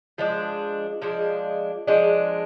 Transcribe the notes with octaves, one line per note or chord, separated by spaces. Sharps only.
F3 G#3 D4
F3 G#3 D4
F3 G#3 D4